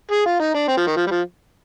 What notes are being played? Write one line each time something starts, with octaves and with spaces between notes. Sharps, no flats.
G#4
F4
D#4
D4
C4
F3
D#3
F3
G3
F3